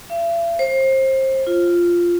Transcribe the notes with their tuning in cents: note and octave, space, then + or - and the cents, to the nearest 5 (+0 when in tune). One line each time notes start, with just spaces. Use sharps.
E5 +45
C5 +25
F4 -5